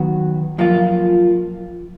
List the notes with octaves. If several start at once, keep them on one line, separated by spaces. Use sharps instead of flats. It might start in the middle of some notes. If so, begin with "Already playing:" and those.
Already playing: D#3 F#3 B3 F#4
F#2 F3 A#3 F4